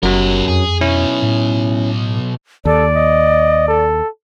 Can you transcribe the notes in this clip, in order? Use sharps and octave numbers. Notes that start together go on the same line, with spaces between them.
F#1 F#2 F#3 G4 A#4
F2 G#4
B2 F#3 C#4 E4
A2
D#2 A4 D5
D#5
A4